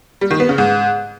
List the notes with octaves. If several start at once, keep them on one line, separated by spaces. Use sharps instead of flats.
G3
D#3
B3
C#3
G#2